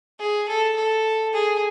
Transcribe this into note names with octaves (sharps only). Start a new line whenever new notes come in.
G#4
A4
A4
G#4